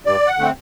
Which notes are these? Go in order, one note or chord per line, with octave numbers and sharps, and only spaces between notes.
G2 D5
F#5
D3 A3 C4